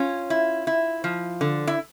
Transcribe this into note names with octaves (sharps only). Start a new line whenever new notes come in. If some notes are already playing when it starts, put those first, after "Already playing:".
Already playing: C#4 F4
E4
E4
F3
D3
E4